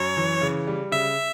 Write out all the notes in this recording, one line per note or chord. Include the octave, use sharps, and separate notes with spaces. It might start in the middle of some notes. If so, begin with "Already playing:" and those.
Already playing: F#2 C#5
E3
C#3
G3
C#3 E5